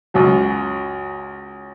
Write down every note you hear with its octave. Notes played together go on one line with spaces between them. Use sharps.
C#2 F#2 F#3